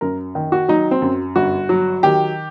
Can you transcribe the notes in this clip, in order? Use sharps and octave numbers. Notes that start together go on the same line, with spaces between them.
F#2 A#4
D#3
F#4
F#3 D#4
C4
F#2
G1 F#4
F#3
D#3 G4